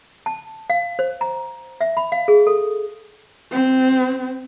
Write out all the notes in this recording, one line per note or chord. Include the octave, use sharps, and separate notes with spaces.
A5
F5
C5
A#5
E5
B5
F5
G#4
A4
C4